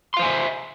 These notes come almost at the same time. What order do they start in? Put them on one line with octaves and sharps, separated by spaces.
C6 F5 C5 G#5 E5